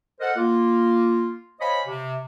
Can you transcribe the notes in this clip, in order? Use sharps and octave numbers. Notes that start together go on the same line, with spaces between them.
A4 A#4 C5 D#5 F#5
A#3 F4
C5 C#5 D#5 F5 G#5 B5
C3